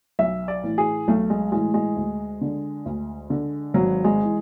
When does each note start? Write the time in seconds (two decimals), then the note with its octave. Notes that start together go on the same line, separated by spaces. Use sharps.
0.19 B1 E5
0.48 D5
0.63 A2 E3
0.78 G#4
1.08 B1 A3
1.30 G#3
1.52 A2 E3 G#3
1.74 G#3
1.96 D2
2.41 D3
2.86 D2
3.30 D3
3.74 G#1 F#3
4.04 G#3
4.23 E3